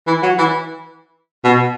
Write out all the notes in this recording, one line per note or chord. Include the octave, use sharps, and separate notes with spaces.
E3
F#3
E3
B2